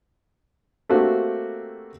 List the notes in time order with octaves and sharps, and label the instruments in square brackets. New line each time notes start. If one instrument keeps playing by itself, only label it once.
[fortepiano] A3 A#3 C4 F#4 G4